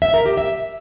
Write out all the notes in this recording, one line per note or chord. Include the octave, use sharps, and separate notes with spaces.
E5
A#4
G4
E5